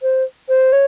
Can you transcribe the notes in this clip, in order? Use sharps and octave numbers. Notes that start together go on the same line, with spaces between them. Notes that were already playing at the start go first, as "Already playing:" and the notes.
C5
C5
C#5